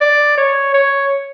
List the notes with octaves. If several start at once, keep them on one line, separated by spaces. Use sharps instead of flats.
D5
C#5
C#5